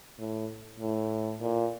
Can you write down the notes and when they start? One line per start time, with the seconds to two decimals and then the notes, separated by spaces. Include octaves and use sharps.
0.18 A2
0.80 A2
1.41 A#2